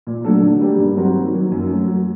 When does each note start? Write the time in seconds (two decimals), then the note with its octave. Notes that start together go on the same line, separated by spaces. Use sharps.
0.07 A#2
0.24 F#3 A3 D4 A4
0.43 D3
0.61 G3 A#3 D4 G4
0.79 G2
0.97 F#3 C4 F#4 A#4
1.15 D#3
1.33 F#3 A#3
1.51 F#2
1.69 F#3 A3
1.88 F#3